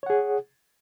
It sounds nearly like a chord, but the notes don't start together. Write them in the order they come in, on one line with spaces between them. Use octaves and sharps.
C#5 F#5 G#4